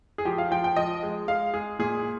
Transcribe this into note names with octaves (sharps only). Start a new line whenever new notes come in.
G#4
F3 G4
F5
F3 G5
G5
F3 D#5
G#3
G#3 F5
G#3 G#4
A#2 G#4